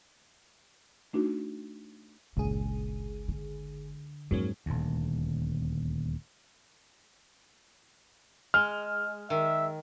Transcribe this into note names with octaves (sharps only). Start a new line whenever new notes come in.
A3 D4 D#4 F#4
G1 C#2 A#2 G#4
D3
F2 G#2 F#3 A#3 C#4
D#1 D2
G#3 F6
D#3 E5